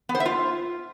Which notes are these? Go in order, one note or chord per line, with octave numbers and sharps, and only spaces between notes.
B3
C5
E5
F4